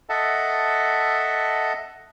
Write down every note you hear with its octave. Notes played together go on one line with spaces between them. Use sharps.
A4 D#5 E5 F#5 A5